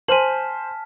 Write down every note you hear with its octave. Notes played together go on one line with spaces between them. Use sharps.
C5 G#5 A5 F6 B6 F#7